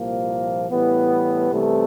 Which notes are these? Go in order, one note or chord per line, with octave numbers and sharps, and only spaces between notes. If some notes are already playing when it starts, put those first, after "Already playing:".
Already playing: C2 A#2 F3 A#3
A2 E3 G3 B3
C2 C3 E3 A3